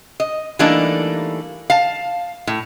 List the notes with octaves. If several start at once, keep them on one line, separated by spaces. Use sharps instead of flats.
D#5
E3 G3 A3 A#3 D4 D#4
F5 A5
A2